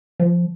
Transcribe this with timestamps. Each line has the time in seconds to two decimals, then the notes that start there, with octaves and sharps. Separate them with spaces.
0.20 F3